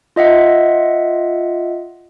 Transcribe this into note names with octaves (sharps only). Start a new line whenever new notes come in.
F4 D#5 E5 F#5